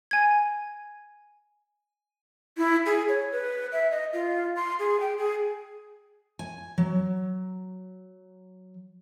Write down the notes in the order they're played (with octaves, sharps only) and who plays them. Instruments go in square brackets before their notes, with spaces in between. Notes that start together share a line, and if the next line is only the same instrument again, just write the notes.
[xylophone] G#5 G#6
[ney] E4
G#4
C#5
B4
E5
D#5
F4
C6
G#4
G5
G#4
[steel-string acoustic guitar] G#5
F#3